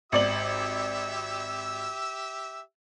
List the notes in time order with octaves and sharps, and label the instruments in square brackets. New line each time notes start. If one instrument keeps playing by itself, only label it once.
[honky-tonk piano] G#1 D5 F#7 [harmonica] G4 E5 E6